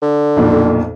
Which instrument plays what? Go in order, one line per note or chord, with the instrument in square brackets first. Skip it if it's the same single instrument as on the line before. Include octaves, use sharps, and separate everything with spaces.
[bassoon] D3
[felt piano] B1 F2 A#2